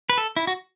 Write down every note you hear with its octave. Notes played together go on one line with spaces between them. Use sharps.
B4
A4
E4
F#4